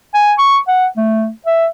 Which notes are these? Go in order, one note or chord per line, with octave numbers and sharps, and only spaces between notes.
G#5
C#6
F#5
A3
E5